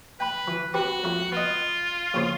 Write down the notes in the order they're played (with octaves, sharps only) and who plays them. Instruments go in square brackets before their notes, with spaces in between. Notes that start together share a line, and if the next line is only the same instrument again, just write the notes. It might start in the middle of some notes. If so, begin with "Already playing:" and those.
[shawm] B4 [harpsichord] G5 B5
[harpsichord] E3
[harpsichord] C4 G4 B4 [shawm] F#4
[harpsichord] F2 A3
[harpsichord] B3 D#5 [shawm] F4
[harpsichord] A#1 C#3 C5